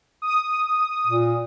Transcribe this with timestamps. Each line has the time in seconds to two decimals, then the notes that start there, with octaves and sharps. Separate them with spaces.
0.22 D#6
1.07 A#2